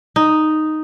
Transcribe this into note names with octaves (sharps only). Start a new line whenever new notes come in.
D#4